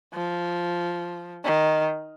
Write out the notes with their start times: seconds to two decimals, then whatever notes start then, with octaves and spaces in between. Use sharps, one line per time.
0.14 F3
1.45 D#3